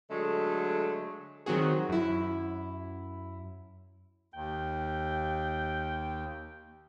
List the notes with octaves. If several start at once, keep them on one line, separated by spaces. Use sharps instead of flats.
D3 F#3 G#3 A3
D#3 F#3 C4 F#4 G#4
F#2 E4
D#2 G5